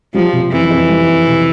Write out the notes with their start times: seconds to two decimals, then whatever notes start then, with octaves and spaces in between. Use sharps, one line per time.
0.14 F3 G3
0.33 C3
0.51 F2 E3
0.70 F2
0.90 G3
1.08 F2
1.28 C3